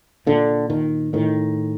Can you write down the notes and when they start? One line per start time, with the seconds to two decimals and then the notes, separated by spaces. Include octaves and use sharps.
0.27 A#2 D3
0.70 D#3
1.13 A2 D#3